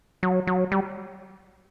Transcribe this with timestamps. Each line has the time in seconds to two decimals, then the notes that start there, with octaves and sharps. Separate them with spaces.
0.23 F#3
0.47 F#3
0.72 G3